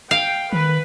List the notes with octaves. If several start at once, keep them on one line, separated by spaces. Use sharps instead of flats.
F5 G5
D#3 B4